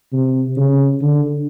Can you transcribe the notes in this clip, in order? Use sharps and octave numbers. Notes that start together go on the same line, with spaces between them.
C3
C#3
D3